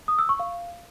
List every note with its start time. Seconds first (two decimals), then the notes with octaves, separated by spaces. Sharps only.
0.08 D#6
0.19 E6
0.29 C#6
0.40 F5